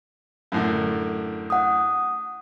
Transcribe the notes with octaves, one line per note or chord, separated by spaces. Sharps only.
F#2 A2 D3
F#5 D#6